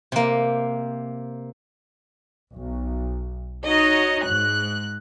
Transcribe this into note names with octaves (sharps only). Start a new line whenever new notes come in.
C3 A#3
B1
D#4 F#4 C#5 D#5
G#2 F#6